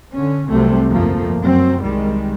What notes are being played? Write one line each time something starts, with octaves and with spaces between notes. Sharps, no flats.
D3 C#4
C2 C3 F#3 G3 A3 C4
G1 F2 F3 A3 A#3
F#2 F#3 C4
C2 D#3 G3 G#3